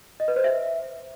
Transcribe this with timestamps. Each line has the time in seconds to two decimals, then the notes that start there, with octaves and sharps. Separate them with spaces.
0.20 D#5
0.28 B4
0.36 C5
0.44 E5